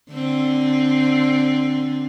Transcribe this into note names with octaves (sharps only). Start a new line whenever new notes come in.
D3 C4